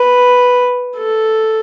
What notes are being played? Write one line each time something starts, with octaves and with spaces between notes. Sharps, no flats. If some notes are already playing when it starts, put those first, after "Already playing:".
Already playing: B4
A4